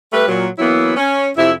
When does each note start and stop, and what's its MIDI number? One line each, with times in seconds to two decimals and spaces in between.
0.12 0.27 55
0.12 0.27 57
0.12 0.27 71
0.28 0.47 46
0.28 0.47 54
0.59 0.92 52
0.59 0.92 54
0.59 0.92 58
0.59 0.92 59
0.59 0.92 64
0.96 1.28 61
1.37 1.52 41
1.37 1.52 48
1.37 1.52 64